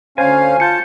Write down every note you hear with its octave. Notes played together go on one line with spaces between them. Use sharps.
D2 C#4 C5 F5 G#5
F4 A5 G6 C#7